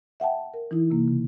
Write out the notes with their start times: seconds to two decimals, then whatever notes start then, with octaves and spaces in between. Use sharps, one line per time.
0.20 E5 F#5 G5 A5
0.54 A#4
0.71 E3 D#4 E4
0.91 C3 A#3
1.08 C#3